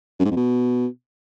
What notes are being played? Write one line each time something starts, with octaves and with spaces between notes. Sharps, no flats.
F#2
G#2
F2
B2